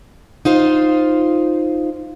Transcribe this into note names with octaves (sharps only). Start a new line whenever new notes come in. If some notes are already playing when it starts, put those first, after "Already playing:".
D#4 F4 C5